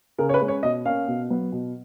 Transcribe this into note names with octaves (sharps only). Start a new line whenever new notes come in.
C#3 A#4
C#5
B4
G#3 C#4
C#5
B2 D#5
A#3 C#4 F5
B2
F#3 B3
B2